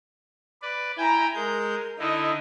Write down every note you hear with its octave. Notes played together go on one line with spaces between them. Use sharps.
B4 D5
E4 G5 G#5 A#5
G#3 A#4 G6
D3 D#4 E4 D#5